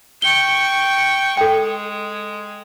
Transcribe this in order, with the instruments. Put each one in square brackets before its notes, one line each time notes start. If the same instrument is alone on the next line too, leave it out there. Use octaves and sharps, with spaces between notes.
[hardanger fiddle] G5 C#6 [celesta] G7
[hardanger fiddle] G#3 [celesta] A4 G5